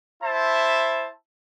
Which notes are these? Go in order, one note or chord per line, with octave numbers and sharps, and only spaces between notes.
E4 C5 E5 A5 B5